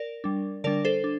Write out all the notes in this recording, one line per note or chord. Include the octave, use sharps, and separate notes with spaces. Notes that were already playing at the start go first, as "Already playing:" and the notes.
Already playing: A#4 D5
G3 D4
D3 G3 D4 A#4 D5
A4 C5
D4